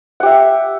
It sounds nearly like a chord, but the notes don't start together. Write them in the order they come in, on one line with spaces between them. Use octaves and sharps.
F#5 G4 E5